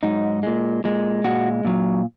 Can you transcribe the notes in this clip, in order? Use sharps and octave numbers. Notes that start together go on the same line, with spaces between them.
G#2 F#3 D#4
A#2 G#3
A#2 G#3
A#2 G#3 F#4
A#2 F#3